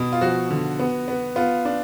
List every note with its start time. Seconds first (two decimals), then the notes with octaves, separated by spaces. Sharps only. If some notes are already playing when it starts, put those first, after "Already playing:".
Already playing: B2
0.13 F4
0.21 F3 F#4
0.50 D3
0.80 B3
1.08 B3
1.36 B3 F4
1.65 D4